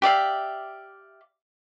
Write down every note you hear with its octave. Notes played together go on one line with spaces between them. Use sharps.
G4 D5 E5 F5